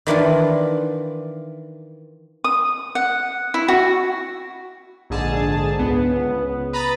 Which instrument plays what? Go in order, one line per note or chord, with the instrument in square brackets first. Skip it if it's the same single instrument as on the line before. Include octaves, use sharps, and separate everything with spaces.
[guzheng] D#3 E3 D4 F4
[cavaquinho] D#6
F#5
E4
F#4
[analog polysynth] A#1 G#2 D3 G#4 A5
C#2 B3
B4 A#5 B5 D#6 A6